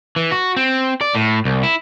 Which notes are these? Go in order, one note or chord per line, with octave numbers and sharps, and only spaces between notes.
E3
F#4
C4
D5
A2
C2
E4